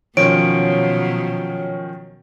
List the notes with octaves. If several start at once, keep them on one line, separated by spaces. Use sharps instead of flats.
B2 D#3 F3 F#3 C#4 C#5 D7